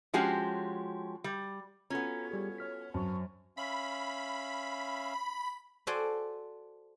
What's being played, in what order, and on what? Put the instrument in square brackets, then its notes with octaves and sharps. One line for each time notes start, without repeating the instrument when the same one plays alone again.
[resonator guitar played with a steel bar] F3 G#3 C#4 F#4 G4
G3
[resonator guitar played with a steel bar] B3 C#4 [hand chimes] F4 F#4 A4 [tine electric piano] A#5
[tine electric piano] G3 G4 G#4
C#5 F6 B6
[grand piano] F#2 [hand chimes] C5 [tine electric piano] A5 C#6
[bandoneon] C#4 E5 F5 [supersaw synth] B5
[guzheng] F#4 A4 C5 D5 G#5